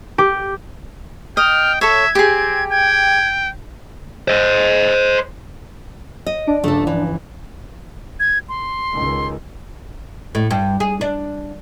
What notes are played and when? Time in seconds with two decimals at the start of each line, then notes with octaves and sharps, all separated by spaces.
0.18 G4
1.37 D#5 G5 F6
1.81 A4 C#5 E5 G#6
2.15 C4 G4 G#4
2.71 G5 G#6
4.28 C5 D#5
6.26 D#5
6.47 D4 D7
6.64 G1 C#2 F3 A3 A4
6.87 E3
8.20 G#6
8.49 C6
8.93 C#2 D#3
10.35 A2
10.51 G2
10.80 G#4
11.01 D4